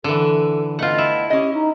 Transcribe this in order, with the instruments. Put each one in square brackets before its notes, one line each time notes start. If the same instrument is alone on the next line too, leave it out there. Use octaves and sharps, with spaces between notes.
[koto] D3 E3 [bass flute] A4
[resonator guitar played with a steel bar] A3 B3 [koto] F4 F#5 [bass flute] D#5
[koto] E4
[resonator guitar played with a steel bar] C#4 D#5 [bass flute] G4
[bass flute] D#4